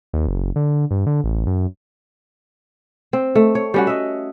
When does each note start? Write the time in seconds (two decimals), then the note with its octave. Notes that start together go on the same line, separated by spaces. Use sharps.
0.13 D#2
0.27 F#1
0.56 D3
0.91 G2
1.06 D3
1.24 A1
1.47 F#2
3.13 C4
3.35 A3
3.55 C#5
3.74 G3 C#4 F#4
3.87 D#5 E5